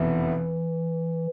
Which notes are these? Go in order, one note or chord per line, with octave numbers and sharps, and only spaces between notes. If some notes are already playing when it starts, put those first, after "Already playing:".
Already playing: F1 E2 B2 E3 B3 E4